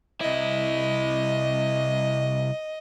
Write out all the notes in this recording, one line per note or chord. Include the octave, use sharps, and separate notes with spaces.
C2 E4 D#5